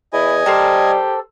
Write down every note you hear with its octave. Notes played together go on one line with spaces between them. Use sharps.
E2 E4 D#5 G#5
G3 G4 A4 A#4 C5